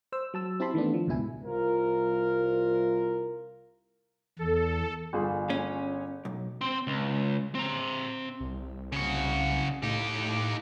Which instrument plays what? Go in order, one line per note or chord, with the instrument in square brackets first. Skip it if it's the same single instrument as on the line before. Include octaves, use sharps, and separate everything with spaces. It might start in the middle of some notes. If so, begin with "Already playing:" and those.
[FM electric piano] C5 E6
F#3 A5 E6
C4 E4 G4 A5 B5 C6
D#3 E3 A3 B3 D4
F3
C#2 G#2 B2 E4 G#5
[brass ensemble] C2 F4 A#4
[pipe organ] E2 [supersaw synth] A4
[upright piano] G1 F4 G#4
[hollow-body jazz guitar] C#4
B1
[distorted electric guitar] C4 C6
C#2
C4 A#5
[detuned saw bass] C2
[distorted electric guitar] C#3 F#4
[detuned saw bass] A2 [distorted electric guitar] D#4 G4